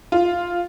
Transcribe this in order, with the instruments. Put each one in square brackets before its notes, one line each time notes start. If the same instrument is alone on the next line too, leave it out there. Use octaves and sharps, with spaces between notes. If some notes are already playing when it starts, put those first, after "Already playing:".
[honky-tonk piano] F4